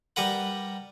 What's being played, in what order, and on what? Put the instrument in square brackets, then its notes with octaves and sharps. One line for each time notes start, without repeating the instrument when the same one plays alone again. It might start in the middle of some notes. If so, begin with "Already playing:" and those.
[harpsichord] G3 A#4 B4 F#5